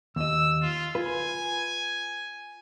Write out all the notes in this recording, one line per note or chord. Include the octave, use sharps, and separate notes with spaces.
D#2 D#5 E6
F4
F4 B4 G#5